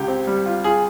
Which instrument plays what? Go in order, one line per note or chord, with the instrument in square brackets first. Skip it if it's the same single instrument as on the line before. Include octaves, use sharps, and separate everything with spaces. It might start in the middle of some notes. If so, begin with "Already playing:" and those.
Already playing: [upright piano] C#2 [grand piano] G4
[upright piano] C4
G3
F4
[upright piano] F4 [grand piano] G#4